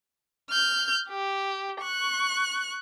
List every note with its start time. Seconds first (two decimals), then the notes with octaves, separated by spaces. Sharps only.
0.50 F6 G6
1.09 G4
1.81 C#6 F#6